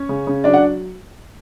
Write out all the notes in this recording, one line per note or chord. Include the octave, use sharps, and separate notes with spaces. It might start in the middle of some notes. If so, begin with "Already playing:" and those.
Already playing: C#4 C#5
C#3
C#3
F#3 D4 D5
F#5